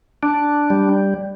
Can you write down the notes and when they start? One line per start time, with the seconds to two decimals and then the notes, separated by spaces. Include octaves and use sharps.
0.23 D4
0.70 G3